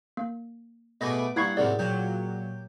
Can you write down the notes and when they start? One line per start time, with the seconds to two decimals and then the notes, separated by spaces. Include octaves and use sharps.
0.17 A#3
1.01 B2 A3 G#4 B4 D#5 D6 A#6
1.36 G2 A#3 E4 F#5 B5 C#6 G#6 C7
1.57 G#2 C3 F#3 E4 G#4 A#4 D5
1.79 A#2 F#3 G4